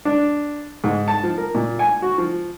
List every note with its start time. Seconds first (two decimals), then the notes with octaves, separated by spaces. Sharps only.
0.05 D4
0.84 G#2
1.08 A5
1.24 F3
1.38 A#4
1.55 A#2
1.79 G#5
2.02 F#4
2.18 F3